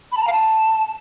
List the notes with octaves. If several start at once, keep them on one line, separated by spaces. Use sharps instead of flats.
B5
A5
A#5
F5
A5